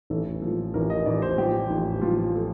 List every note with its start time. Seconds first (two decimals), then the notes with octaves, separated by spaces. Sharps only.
0.10 A1 A4
0.42 F3
0.74 A1 A#4
0.90 D#5
1.06 A1 D5
1.22 C5
1.38 F3 G4
1.70 A1
2.01 F3 F4
2.35 A4